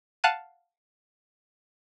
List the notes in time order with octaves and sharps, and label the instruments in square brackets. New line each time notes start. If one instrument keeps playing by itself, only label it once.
[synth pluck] F5 F#5 A5 F#6 D#7